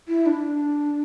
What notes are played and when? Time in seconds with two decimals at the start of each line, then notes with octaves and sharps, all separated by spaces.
0.08 E4
0.26 D4